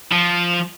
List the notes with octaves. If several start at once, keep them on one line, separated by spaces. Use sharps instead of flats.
F3